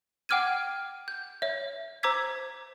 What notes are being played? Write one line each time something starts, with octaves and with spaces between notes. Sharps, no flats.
F#5 G5 D6 F6 G#6 D#7
G6
C#5 E5
C5 A#5 D6 E6 G#6 B6